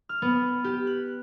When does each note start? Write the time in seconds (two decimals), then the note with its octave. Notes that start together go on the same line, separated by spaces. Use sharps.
0.09 F6
0.22 B3
0.64 G4
0.87 F#6